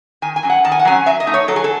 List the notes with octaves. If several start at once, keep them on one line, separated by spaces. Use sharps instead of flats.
D#3 G#5
G#5
F#3 C#4
F#5
D#3 A5
G#5
F#5
F#3 C#4 G#5
F#3 E5
D#5
A3 D#4
C#5
F#3 A4
G#4
A4